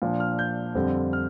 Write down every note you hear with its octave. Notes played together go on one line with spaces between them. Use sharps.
A#2 F3 D4
F6
G6
F2 D3 G3 C4
F6